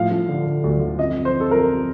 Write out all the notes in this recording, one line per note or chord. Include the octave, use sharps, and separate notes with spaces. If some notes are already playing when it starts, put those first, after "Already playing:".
Already playing: A2 F3 F5
F3
D3
D3
D2
D3
F2 D#5
F2
C5
F2
A4
F2 A#4